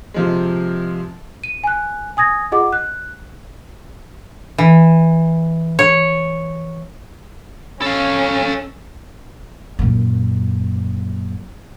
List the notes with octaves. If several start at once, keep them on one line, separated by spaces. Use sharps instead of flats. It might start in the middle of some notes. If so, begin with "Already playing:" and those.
C3 F3 G#3
D#7
G#5 F#6
G#5 D#6 G#6 A#6
F4 G#4 D#5 F#5 D6
F#6
E3
C#5
C#4 A4 F5
F#2 A#2